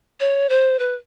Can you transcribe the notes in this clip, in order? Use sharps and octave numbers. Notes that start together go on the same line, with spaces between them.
C#5
C5
B4